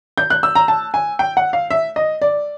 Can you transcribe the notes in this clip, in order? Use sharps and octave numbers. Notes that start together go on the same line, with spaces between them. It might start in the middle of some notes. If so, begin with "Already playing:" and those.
G6
F#6
E6
A#5
A5
G#5
G5
F#5
F5
E5
D#5
D5